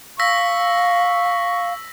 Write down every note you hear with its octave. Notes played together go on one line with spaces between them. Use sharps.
F5 C#6 E6 A#6 B6